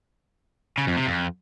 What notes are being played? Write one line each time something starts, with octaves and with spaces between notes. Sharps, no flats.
C#3
F2
C3
F2